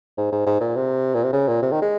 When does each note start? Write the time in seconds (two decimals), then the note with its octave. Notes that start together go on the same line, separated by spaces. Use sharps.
0.18 G#2
0.32 G#2
0.47 G#2
0.61 A#2
0.76 C3
1.14 A#2
1.24 C3
1.33 C#3
1.48 A#2
1.62 C3
1.72 D#3
1.82 G#3